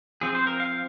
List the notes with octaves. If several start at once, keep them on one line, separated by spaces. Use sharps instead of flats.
F3 C4 G#4
C5
A#4
F5